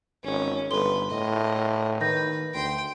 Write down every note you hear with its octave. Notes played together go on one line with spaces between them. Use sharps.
G#1 C#4
G1 A4 B4 C6 G7
A2 D#5
D#3 B4 G6 A#6
D2 G5 C6